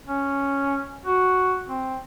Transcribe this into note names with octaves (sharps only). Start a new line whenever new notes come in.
C#4
F#4
C4